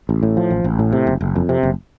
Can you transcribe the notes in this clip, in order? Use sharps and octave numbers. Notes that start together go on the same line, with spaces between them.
A1
A2
F3
A1
A1
A2
C3
F#1
F#1
F2
C3
F#1